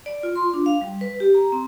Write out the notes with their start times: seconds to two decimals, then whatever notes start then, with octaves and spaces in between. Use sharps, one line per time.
0.06 D5
0.23 F4
0.36 C6
0.54 D4
0.66 F5
0.81 G3
1.01 B4
1.20 G4
1.34 A#5
1.52 C4